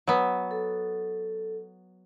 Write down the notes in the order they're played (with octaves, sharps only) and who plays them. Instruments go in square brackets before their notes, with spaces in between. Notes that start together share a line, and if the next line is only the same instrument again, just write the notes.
[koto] F#3 B3
[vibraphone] A4